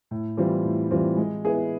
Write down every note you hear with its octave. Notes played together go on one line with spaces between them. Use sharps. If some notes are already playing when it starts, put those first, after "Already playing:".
A2
E3 G3 C4 F4
A2
E3 G3 C4 F4
G#3
B3 E4 G#4